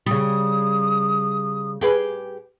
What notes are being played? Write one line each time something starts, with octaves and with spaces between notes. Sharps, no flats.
C#3 G3 D#6
G4 G#4 B4